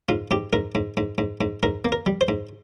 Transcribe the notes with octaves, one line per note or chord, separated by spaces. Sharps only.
G#2 F4
G#2 G4
G#2 A#4
G#2
G#2
G#2
G#2
G#2 A#4
A#3
A#4
G3
C5
G#2